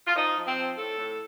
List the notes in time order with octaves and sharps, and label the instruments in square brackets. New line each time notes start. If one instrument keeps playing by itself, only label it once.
[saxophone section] F4
F3 D#4
F3
C4
F3
A2 A4
A2